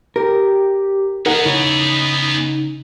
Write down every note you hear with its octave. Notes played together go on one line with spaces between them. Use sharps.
G4 A#4
B3 D#4 G#4 A#4 F#5
C#3 E4